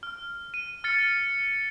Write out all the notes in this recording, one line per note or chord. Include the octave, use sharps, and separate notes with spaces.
F6
D#7
F6 A6 C#7